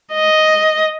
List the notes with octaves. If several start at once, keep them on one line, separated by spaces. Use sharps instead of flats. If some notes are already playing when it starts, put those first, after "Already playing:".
D#5